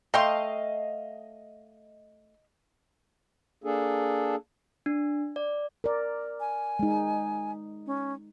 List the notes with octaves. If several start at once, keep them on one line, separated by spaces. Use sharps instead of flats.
A3 D#5 F5 G5 C6
A#3 D4 G#4 A4
D4
D5
A#4 D5
G#5
G#3 D#4
C#4